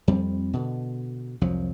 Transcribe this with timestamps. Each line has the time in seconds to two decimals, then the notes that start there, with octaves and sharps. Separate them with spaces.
0.08 F2 G3 C4
0.53 B2 D3
1.41 C2 F2 F3 F#3